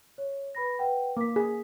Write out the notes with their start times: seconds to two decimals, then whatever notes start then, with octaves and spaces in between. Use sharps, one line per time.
0.18 C#5
0.55 B4 B5 A#6
0.79 B4 F#5 G5
1.17 A#3 D6 B6
1.36 G#4 B6